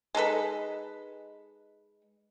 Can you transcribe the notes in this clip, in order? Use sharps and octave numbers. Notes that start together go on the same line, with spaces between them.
G#3 D#4 A4 B4